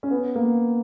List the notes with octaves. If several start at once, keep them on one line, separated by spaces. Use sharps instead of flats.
C#4
B3
A#3